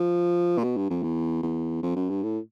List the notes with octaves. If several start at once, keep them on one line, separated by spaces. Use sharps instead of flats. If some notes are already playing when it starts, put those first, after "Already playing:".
Already playing: F3
A#2
B2
G2
F2
E2
E2
F2
F#2
G2
A2